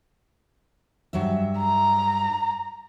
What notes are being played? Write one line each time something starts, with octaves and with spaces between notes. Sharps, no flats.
G2 F#3 E5
A#5